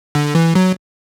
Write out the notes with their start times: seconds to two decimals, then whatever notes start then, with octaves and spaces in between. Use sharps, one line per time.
0.15 D3
0.35 E3
0.55 F#3